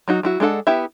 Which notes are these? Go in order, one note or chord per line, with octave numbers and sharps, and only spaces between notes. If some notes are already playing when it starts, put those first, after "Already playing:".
F#3 D#4 F#4
F#3 E4 F#4
G#3 D4 A4 F#5
B3 E4 G4 E5